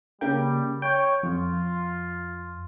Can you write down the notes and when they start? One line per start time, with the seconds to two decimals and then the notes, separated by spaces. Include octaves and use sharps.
0.21 C#3 G3 A#3 G5
0.82 C#5 G5
1.23 F2 F4